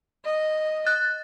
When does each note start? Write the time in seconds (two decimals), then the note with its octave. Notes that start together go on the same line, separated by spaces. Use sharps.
0.25 D#5
0.86 F#6 A6